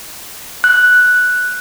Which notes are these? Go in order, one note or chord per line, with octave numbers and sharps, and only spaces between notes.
F#6